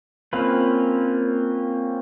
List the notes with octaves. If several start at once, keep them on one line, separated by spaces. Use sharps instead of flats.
A#3 C4 C#4 F4 B4